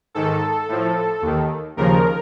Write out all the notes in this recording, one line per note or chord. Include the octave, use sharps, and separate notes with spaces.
G#2 D#3 A4
A2 F3
D#2 D#3
D#2 C#3 F3 A#4